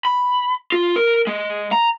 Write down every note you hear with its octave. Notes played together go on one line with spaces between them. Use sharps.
B5
F4
A#4
G#3
A#5